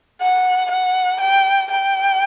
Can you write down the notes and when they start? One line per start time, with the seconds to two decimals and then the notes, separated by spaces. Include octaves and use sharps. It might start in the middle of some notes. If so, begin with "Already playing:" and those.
0.21 F#5
0.71 F#5
1.20 G5
1.71 G5